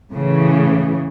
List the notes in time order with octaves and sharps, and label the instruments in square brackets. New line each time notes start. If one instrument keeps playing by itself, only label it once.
[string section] A2 C#3 E3